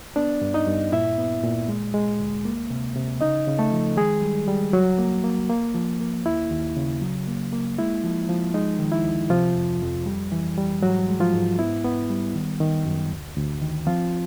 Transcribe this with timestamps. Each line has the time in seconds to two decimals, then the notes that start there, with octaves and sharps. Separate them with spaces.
0.16 B3 D4 D5
0.42 G2
0.54 D#4 D#5
0.67 G2
0.92 A#2 E4 E5
1.18 B3
1.44 A#2
1.68 G#3
1.94 G#3
2.20 D2
2.45 A#3
2.70 C3
2.96 C3
3.21 C#3 D#4 D#5
3.47 C#3
3.59 A3 A4
3.72 F3
3.97 D#3 G#3 G#4
4.22 G3
4.47 G3
4.73 C#2 F#3 F#4
4.98 A#3
5.24 A#3
5.49 A#3
5.74 F3
6.01 A#3
6.26 D#2 E4
6.51 D#2
6.77 C#3
7.02 F#3
7.27 A#3
7.53 A#3
7.79 G#3 E4
8.04 F3
8.29 F3
8.54 G#3 D#4
8.79 D#3
8.92 E4
9.05 D2
9.30 C3 F3 F4
9.56 F2
9.81 F2
10.06 G3
10.32 E3
10.57 G3
10.82 G#2 F#3 F#4
11.08 G#3
11.20 F3 F4
11.33 G#2
11.59 B3 E4
11.85 B3
12.10 G3
12.35 D#3
12.60 D#3
12.85 F#2
13.11 D2
13.37 D2
13.62 D#3
13.87 F3 C4 F4